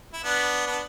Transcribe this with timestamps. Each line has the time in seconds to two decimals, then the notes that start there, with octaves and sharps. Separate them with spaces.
0.13 E4
0.24 B3 D4
0.67 B3 D4